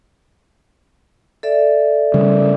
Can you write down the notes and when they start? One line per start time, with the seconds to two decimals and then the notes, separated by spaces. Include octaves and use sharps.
1.43 A4 D5 E5
2.14 C#3 G3